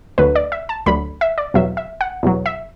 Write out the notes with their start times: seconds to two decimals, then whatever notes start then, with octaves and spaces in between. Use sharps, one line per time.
0.18 D2 D3 F#3 B4
0.35 D5
0.52 E5
0.69 A5
0.86 D2 D3 F#3 B5
1.21 E5
1.38 D5
1.54 E2 B2 F#3 E5
1.77 E5
2.01 F#5
2.23 E2 B2 F#3
2.46 E5